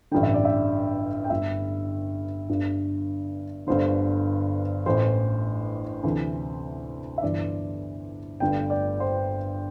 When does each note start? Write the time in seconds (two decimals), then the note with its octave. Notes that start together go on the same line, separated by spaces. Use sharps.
0.11 A1 G2 D3 G5
0.23 E5
0.34 D5
0.45 E5
1.24 G5
1.30 G1 G2 D3 E5
2.49 G1 G2 D3
3.67 G1 G2 D3 C5
4.86 A1 A2 E3 C5
6.04 D2 C3 E3
7.18 E5
7.22 G1 G2 E3 D5
8.40 G1 G2 D3 G5
8.70 D5
9.00 C5